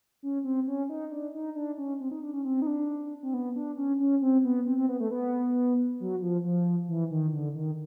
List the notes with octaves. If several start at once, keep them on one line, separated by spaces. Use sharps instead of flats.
C#4
C4
C#4
D#4
D4
D#4
D4
C#4
C4
D#4
D4
C#4
C4
D#4
D4
C4
B3
D4
C#4
C#4
C4
B3
C4
C4
B3
A3
B3
F#3
F3
F3
E3
D#3
D3
D#3